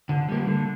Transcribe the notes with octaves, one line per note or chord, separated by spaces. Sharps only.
D3
G3 A#3
D3